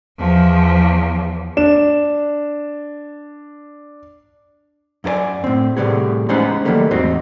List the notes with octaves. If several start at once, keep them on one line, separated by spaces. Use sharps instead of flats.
E2 F3
D4 E7
F#2 E4 A#4 D5 G#5
A2 C4
A2 C3 G3 B3 G#4
G#3 B3 C#4 D#4 C5 F#5
D#3 E3 F#3 G3 A3 A#3
E2 G#2 C4 D#4 F#4